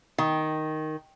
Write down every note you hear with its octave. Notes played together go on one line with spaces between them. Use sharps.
D#3